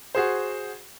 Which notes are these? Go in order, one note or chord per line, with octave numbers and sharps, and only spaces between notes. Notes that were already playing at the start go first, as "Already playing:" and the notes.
F#4 G#4 C5